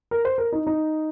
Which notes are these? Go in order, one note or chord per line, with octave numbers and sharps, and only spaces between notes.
A#4
C5
A#4
D#4
D#4